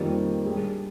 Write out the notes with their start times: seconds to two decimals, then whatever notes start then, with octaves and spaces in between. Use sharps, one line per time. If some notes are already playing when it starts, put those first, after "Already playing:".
Already playing: F2 D#3 G3 A#3
0.45 G3 D4 G#4